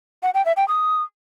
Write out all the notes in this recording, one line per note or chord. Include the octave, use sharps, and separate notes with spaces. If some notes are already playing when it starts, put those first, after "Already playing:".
F#5
G5
E5
G5
D#6